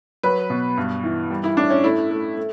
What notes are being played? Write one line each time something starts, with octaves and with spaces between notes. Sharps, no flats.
F#3 B4
B2
G2
E3
G3
E4
A2 D4
C#4
A3 E4
A3
A3